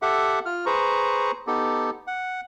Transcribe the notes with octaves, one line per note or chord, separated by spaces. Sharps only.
G4 A4 E5 F#5
F4 F6
G#4 B4 C5 A#5 C#6
B3 D#4 G4 A4
F#5